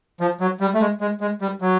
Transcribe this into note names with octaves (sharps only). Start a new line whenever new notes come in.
F3
F#3
G3
A3
G#3
G#3
G#3
G3
F#3